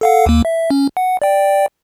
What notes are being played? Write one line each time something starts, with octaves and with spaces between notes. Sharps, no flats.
A4 F5 F#5
D#2 A#3
E5
C#4
F#5
D5 G5